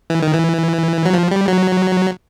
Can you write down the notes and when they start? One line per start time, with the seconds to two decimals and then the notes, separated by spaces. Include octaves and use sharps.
0.10 E3
0.22 D#3
0.34 E3
1.05 F#3
1.13 F3
1.31 G3
1.48 F#3